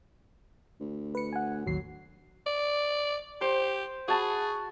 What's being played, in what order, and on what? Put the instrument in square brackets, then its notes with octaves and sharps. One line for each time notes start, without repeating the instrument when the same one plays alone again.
[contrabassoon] D2
[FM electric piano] B4 C#7
F#5 G#5
[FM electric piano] A1 D#2 C7 [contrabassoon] F#3
[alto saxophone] D5
[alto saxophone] G4 [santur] C5
[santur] F#4 A5 B5 [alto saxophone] G#4